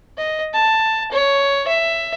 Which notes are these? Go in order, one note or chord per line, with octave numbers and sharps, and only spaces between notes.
D#5
A5
C#5
E5